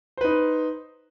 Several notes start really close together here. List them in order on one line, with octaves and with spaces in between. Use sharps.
C5 B4 D#4